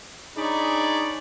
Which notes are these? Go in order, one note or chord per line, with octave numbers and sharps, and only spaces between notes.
D4 D#4 G#4 C#5 D5 B5